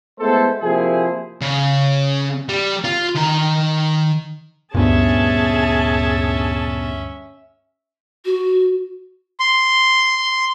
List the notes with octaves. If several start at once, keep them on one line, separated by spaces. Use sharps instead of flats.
G#3 A3 B3 E4 A4 C5
C3 F3 A#3 E4 G#4 C5
C#3
G3
F4
D#3 A#5
D2 G2 A#2 B3 C#4 G#4 E5 A5
F#4
C6